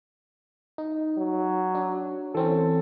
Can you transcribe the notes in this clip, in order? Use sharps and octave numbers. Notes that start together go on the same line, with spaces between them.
D#4
F#3
D4
E3 C4 C#4 A4